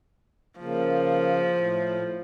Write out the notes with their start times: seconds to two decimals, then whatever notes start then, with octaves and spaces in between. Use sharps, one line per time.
0.59 C#3 F3 A#3
1.53 A2